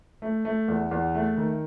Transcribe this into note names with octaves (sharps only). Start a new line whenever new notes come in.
A3
A3
E2
E2
A3
D#3